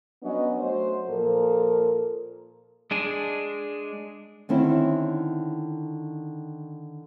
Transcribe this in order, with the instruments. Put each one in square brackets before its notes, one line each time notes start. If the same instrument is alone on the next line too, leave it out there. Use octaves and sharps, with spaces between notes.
[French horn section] F#3 B3 C#4 D4 D#5
F#3 A3 F#4 C5
A#2 F3 A4 A#4
[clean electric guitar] G#3 D4 G#4
[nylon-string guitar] D3 D#3 C4 C#4 E4